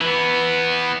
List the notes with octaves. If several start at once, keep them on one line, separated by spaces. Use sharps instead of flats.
E3 B3